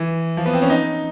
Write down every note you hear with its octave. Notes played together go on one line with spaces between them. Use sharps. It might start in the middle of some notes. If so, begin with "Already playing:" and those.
Already playing: E3
F3
B3
C4
C#4
D#4